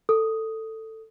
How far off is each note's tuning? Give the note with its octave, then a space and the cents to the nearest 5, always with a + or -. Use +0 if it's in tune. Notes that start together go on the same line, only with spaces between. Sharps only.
A4 +10 D#6 +0